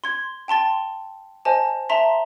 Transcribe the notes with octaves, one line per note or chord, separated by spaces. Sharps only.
C6 G#6
G5 A5 C6 A6
C5 D#5 G#5 A5
E5 A5 A#5 C6 B6